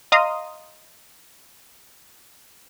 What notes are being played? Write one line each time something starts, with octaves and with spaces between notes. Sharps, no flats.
D#5 F5 A#5 C6 D#6